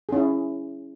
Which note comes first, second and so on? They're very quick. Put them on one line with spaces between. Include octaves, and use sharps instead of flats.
G#4 C#4 E4